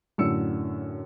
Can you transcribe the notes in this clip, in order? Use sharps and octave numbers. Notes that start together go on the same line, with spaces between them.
F#2 A2 D3 E6 C#7